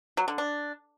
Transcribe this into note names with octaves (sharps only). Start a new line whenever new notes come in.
F#3
D3
D4